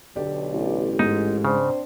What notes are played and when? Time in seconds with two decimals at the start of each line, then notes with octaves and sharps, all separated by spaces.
0.16 B1 D3 G4 D5
0.53 A1
0.99 G#2 D#4
1.45 C#3 C4 D4 C5